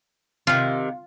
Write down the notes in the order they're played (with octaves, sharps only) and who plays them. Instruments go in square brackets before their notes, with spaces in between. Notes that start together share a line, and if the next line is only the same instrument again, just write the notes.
[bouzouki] C3 D#3 [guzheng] F4